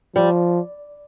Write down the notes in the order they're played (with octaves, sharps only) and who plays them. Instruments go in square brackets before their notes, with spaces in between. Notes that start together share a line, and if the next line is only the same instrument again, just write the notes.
[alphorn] F3 [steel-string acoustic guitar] G3